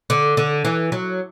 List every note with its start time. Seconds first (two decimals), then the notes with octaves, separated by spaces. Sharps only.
0.10 D3
0.37 D3
0.65 E3
0.92 F#3